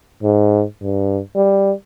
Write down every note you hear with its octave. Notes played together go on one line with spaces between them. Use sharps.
G#2
G2
G3